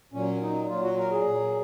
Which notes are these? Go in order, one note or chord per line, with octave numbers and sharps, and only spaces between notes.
A#2 F#3 C#4
D#4
A#2 F#3 F4
F#4
A#4
G#4
A#2 F#3